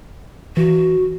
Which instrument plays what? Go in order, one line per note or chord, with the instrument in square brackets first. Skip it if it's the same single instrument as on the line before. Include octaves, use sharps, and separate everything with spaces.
[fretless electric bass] E3 [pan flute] F#4